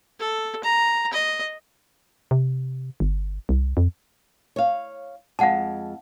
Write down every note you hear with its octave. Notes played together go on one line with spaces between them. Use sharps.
A4
A#5
D#5
C3
G1
C2
F2
C#5 F5
F2 G#3 F5 F#5 A5